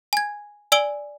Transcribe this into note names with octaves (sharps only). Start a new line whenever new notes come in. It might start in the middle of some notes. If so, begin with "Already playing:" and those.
G#5 G#6
D5 G#5 E6 D7 F#7 G7